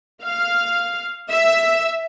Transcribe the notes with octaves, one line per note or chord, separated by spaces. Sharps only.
F5
E5